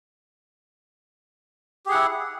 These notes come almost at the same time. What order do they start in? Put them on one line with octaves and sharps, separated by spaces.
G4 G#4 F#5 E4